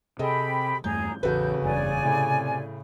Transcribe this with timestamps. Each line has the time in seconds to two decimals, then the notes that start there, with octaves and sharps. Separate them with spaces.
0.19 C3 G#4 A4 D#5 G5 B5
0.84 E2 G2 A3 G#4 A#5 G6
1.23 A1 E2 C#3 F#4 A4 B4 G6
1.62 F#1 E2 G2 D5 G#5
2.05 A2 C3